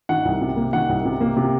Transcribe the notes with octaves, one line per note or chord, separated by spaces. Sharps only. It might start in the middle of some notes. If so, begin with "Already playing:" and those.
D#3 F#5
C2
C3
A#3
D#3 F#5
C2
C3
A#3
C3